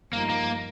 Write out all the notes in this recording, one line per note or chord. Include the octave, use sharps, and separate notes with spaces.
G2 F3 A#3 D#4
A#3